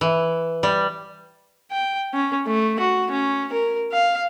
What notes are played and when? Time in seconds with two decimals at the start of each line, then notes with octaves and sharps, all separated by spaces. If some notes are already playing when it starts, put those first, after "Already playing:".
0.01 E3
0.63 G3
1.71 G5
2.14 C#4
2.46 A3
2.80 F#4
3.11 C#4
3.52 A#4
3.92 F5